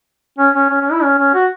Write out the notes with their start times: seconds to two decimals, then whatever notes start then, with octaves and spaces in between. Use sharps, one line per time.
0.38 C#4
0.55 C#4
0.70 C#4
0.81 C#4
0.91 E4
1.02 C#4
1.18 C#4
1.34 F#4